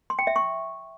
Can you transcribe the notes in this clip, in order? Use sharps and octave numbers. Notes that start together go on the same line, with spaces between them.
C6
G5
E5
C#6